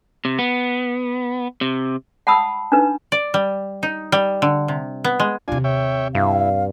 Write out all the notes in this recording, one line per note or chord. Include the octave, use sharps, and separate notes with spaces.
C3
B3
C3
F#5 A5 B5 D#6 E6
D4 D#4 B4
D5
G3
D#4
G3
D3
C3
B3
G#3
D#2 C3 D4 F4 G#5
C#5 E5 G5
G2 E4 F5